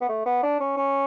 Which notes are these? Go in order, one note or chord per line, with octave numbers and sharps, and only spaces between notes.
B3
A3
B3
D4
C#4
C#4